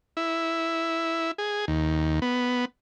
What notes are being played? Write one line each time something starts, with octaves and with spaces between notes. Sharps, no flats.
E4
G#4
D#2
B3